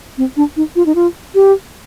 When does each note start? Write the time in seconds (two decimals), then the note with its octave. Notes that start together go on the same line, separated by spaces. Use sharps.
0.18 C4
0.37 D4
0.57 D#4
0.76 F4
0.86 D#4
0.95 F4
1.35 G4